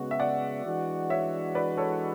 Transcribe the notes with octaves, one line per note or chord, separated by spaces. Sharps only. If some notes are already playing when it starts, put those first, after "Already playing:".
Already playing: C#3 G#3 B3 F#4
E5
D5 F#5
E3 G#3 D4 F#4
C#5 E5
B4 D5
A4 C#5